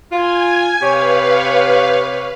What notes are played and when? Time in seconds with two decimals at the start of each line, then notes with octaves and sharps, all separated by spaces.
0.11 F4 G#5 G#6
0.81 C3 G4 B4 C#5 F5